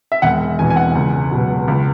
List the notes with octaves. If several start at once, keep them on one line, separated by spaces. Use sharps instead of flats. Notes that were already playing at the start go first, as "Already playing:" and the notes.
E5
E1 F#5
E2 B2 G#5
G#5
F#5
C#2
B2 F#3
C#2